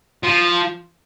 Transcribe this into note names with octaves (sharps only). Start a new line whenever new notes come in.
F3